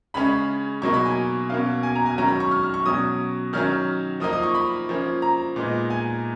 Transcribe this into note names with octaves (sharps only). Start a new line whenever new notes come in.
C#3 G#3 C#4 B5
B2 F#3 A#3 D#4 C#6
B5
G#5
B2 A#3 C#4 F5
G#5
A#5
G#5
D#3 F#3 C#4 A#5
B5
C#6
F6
F6
C#6
B2 F#3 C#4 D#6
D#3 F#3 C#4 F6
F3 A#3 D#4 D#6
D#6
C#6
B5
F3 A#3 C#4
A#5
A#2 G#3 B3 D#4
G#5